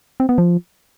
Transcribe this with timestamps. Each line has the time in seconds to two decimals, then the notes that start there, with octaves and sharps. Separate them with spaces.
0.20 C4
0.29 B3
0.38 F3